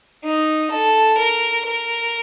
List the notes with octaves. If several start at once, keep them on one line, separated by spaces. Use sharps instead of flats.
D#4
A4
A#4
A#4